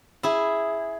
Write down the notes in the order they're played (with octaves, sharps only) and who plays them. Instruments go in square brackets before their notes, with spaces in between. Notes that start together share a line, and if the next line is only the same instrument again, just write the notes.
[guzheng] E4 G#4